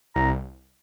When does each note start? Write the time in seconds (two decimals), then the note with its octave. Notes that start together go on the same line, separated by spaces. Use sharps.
0.15 C2 A#5